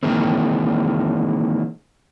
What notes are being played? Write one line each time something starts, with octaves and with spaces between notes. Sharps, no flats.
D#3 E3 G#3 A#3 C4